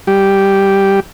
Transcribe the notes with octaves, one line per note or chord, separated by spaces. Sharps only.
G3 G4